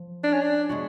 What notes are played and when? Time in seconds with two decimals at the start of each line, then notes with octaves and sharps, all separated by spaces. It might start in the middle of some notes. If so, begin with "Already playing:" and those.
Already playing: F3
0.24 D4
0.33 C#4
0.42 D4
0.69 G#3 B3 F#4